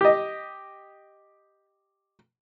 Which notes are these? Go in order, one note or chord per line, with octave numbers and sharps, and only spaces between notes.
G4 D#5